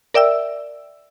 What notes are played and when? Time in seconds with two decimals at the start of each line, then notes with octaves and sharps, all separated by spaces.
0.14 A#4 D5 E5 G5 E6